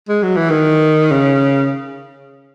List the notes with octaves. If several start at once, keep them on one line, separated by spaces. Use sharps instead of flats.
G#3
F#3
E3
D#3
C#3